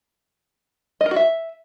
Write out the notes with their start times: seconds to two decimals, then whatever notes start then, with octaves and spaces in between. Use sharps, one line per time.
1.01 D#5
1.06 A#4
1.11 F#4
1.16 E5